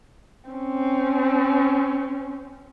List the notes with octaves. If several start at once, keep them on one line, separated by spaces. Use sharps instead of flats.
C4 C#4